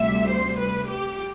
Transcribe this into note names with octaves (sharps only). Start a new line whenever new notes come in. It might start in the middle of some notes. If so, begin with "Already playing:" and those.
Already playing: D2 C3 G3 E5
C5
B4
G4